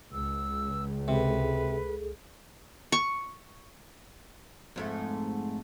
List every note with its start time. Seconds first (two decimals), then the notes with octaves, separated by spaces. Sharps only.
0.13 C#2 E6
1.08 C3 G#4 A4 B4
2.92 C#6
4.76 F2 G#2 A3